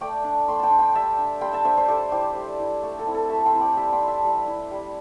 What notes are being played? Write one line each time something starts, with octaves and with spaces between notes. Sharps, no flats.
A3 D5 G5
D4
A3 G5 C6
G5 A5 C6
D4
G5 C6
G3 E5 A5
D4
G3 G5 C6
E5 A5
D4 C5 E5
C5 E5
G3 A4 D5
E4 G4 C5
G3
E4
A3 A4
A4
C4 E4
A4
A3 E5 A5
G5 C6
C4 E4 A5
D5 G5
G3 E5 A5
G5 C6
E4
E5 A5
G3
E4
G3